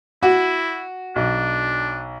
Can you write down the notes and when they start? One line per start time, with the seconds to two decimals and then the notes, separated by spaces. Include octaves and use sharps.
0.23 E4 F#4
1.16 B1 D4